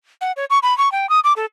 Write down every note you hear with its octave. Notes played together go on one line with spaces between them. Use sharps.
F#5
C#5
C#6
B5
C#6
G5
D#6
D6
A4